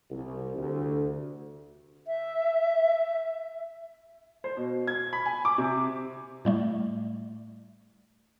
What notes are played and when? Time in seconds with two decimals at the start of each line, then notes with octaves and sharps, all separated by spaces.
0.10 C2
0.57 D2
2.07 E5
4.44 C5
4.57 B2
4.87 G#6
5.13 B5
5.26 G#5
5.45 D6
5.58 C3
6.45 A2 G3 A3